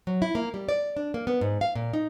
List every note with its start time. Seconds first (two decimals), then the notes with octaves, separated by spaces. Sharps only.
0.07 F#3
0.22 E4
0.35 A#3
0.54 G3
0.69 D5
0.97 D4
1.14 A#3
1.27 B3
1.41 G#2
1.61 F5
1.75 A#2
1.93 D#4